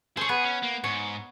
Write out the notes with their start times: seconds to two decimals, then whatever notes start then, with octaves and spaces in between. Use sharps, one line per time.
0.17 G#4 A4 C5 C#5
0.29 B3 G#4
0.45 C#4
0.63 A#3
0.84 G#2 C#5